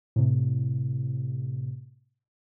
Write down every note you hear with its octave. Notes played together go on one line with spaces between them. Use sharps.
A2 C3